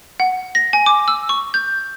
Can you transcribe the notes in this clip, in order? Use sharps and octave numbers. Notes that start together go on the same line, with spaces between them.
F#5
A#6
G#5
D6
E6
C#6
G6